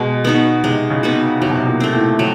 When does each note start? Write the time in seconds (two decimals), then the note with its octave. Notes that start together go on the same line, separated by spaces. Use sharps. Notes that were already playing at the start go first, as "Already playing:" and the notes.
Already playing: B2 G#3
0.25 B3 D#4 F#4
0.64 C3 G#3
0.90 C#3
1.03 B3 D#4 F#4
1.41 C3 F#3
1.50 B2
1.57 C3
1.67 A#2
1.80 A3 C4
1.94 A2
2.19 F#3